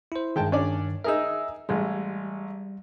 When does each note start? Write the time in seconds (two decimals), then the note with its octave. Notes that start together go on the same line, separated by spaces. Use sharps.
0.12 E4 C5
0.36 G2 D#3 G#3 G5 A5
0.52 C#4 D4 D5
1.04 D#4 G#4 A#4 E5 E6
1.69 A1 G3 G#3